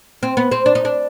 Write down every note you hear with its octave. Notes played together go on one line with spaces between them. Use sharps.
C4
B3
C4
D4
D#4
D4